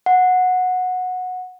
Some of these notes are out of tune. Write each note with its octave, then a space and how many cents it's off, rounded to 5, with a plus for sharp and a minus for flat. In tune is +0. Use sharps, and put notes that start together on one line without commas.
F#5 -15